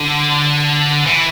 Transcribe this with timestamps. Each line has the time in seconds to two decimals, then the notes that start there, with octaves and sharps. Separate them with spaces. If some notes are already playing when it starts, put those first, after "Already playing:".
Already playing: D3
1.05 E3